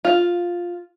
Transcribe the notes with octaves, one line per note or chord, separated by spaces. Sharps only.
F4